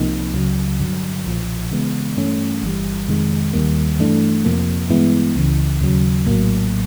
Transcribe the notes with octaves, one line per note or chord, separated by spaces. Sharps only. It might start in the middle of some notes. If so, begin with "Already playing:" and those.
Already playing: C2 C3 F3 A#3 D#4
C#2 C#3 F#3
G2 D3 F#3
B1 A#2 F3
C#3 E3 G#3 B3
G2 E3 A3 C#4
G1 G2 E3 G3
F2 C3 D#3 G#3
D#2 D#3 G3 A#3
G2 E3 A3 D4
F2 C3 F3 A#3
G2 E3 G#3 B3 E4
C#2 C#3 E3
D#2 C#3 F#3
A#1 A2 F#3 A#3